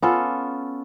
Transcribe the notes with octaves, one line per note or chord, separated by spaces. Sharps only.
B3 C#4 F4 A4